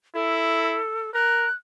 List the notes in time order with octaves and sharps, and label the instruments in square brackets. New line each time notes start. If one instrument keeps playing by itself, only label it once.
[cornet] E4 [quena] A4
[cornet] A#4 [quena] F#6